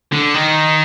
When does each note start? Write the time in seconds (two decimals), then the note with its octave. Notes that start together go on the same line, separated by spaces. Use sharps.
0.12 D3
0.34 D#3